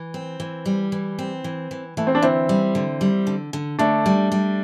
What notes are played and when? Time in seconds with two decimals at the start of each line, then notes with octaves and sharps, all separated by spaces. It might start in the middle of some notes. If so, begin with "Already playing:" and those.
Already playing: E3
0.14 C4
0.40 E3
0.66 G3
0.92 E3
1.19 C4
1.44 E3
1.71 E3
1.97 E3 A3
2.07 C4
2.15 D4
2.22 D3 C4 E4
2.49 G3
2.75 D3
3.01 G3
3.27 D3
3.53 D3
3.79 D3 A3 D4
4.06 G3
4.32 G3